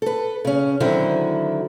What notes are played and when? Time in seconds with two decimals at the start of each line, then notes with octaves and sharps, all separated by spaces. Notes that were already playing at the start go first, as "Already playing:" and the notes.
0.02 A4 B4
0.45 C#3 C#4
0.80 D3 D#3 F#3 C4 E4